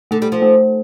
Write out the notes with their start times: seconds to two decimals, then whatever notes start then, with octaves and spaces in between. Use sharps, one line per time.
0.11 D3 A3
0.22 G3
0.32 F3
0.42 A3